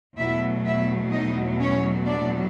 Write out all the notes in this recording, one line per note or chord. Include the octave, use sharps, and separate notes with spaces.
E2 B2 F#3 A3 E4 E5
E4 E5
D#4 D#5
C#4 C#5
D4 D5